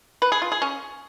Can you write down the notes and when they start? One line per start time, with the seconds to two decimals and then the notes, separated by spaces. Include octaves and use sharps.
0.22 B4
0.32 G#4
0.42 F4
0.52 G#4
0.62 C#4